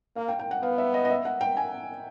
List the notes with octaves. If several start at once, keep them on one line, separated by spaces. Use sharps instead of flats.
A#3 F5
G5
G5
F#5
B3 F5
E5
D#5
D#5
E5
F#5
G5
G#5